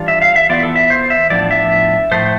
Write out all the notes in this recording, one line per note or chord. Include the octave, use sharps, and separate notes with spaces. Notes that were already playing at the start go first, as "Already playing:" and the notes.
Already playing: E3 G3 D4 F4
E5
F5
E5
E3 B3 F4 D5
A4
E5
C5
E5
A2 F3 B3 D4 D5
E5
A2 F3 A3 C5